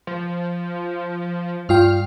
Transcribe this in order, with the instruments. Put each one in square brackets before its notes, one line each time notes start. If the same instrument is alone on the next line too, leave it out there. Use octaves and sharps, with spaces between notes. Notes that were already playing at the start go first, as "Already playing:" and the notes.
[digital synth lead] F3
[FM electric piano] G2 F4 G5 [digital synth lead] F6